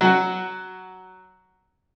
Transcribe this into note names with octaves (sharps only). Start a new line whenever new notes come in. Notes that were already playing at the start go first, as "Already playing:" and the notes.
F#3 F#4